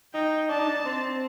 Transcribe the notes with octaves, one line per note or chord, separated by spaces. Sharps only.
D#4 G5
D4 A5
D#4
D4
C4